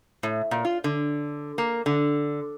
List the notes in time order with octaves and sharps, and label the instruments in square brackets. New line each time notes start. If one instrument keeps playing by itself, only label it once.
[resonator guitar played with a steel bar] A2
A#2
F4
D3
A#3
D3